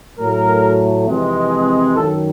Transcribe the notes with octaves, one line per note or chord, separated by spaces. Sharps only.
A2 F#3 A3 A#4
F2 C3 E3 G#3
F#2 D#3 F#3 A4